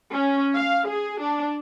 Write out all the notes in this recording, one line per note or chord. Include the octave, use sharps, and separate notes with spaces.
C#4
F5
G#4
D4